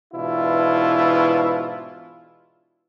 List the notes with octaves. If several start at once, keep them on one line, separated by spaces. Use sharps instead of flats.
G#2 B2 E3 D4 E4 F4